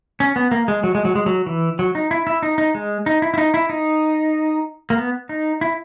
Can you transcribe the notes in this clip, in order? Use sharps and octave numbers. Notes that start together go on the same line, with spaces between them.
C#4
B3
A#3
G#3
F#3
G#3
F#3
G#3
F#3
E3
F#3
D#4
E4
E4
D#4
D#4
G#3
D#4
E4
E4
D#4
E4
D#4
A#3
B3
D#4
E4